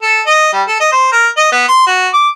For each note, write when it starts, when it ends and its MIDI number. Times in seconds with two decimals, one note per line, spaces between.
0.02 0.21 69
0.26 0.51 75
0.53 0.62 55
0.67 0.75 69
0.80 0.87 75
0.92 1.11 72
1.12 1.27 70
1.37 1.50 75
1.52 1.64 59
1.68 1.86 84
1.86 2.08 66
2.13 2.29 86